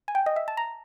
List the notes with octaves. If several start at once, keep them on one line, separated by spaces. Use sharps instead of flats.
G#5
G5
D#5
E5
A5
A#5